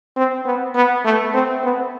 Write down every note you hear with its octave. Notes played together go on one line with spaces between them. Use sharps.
C4
B3
B3
A3
C4
B3